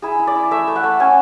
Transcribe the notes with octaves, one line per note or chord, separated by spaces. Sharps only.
E4 G#4
E4
D5
E4
A3 E5
A3
F#5
A3
C#4 G#5